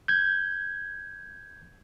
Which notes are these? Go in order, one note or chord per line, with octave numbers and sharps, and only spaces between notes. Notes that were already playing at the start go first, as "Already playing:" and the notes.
G6 G#6